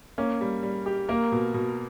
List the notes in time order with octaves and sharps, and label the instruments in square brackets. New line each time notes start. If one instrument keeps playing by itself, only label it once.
[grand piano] A#3 [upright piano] C#4
[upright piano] G3
G3
G4
[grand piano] A#3 [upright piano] A#4
[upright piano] B2
B2